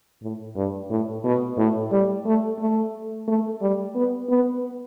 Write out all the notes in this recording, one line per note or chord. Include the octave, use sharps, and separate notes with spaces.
A2
G2
A2
B2
A2
G3
A3
A3
A3
G3
B3
B3